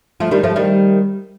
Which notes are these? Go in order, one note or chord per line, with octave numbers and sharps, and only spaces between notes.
F3 A3
D#3 G3
F3 A3
D#3 G3